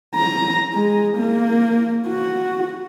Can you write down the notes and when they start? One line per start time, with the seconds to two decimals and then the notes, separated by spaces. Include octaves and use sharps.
0.15 A#5
0.74 G#3
1.17 A#3
2.08 F#4